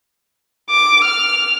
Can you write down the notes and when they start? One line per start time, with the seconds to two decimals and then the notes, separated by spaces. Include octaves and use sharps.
0.70 D6
1.04 F6